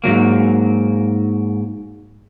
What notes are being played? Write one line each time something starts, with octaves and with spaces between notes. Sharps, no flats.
G#2 F3 F#3 A#3